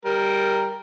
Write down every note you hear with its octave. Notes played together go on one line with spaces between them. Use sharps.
G3 A#4